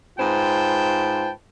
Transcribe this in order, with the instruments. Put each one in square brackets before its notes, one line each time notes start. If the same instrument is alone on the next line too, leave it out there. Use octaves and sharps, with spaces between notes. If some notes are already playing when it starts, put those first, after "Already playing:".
[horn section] G#2 F4 B4 C5 G5 A5